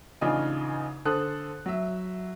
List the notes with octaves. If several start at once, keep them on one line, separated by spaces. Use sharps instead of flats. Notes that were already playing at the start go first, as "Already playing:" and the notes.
A1 C#3 D4 D#4 F4 G#5
D3 A4 C5 D#6 F#6
F#3 E5